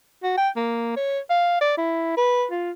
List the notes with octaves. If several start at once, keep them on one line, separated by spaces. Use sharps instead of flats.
F#4
G5
A#3
C#5
F5
D5
E4
B4
F4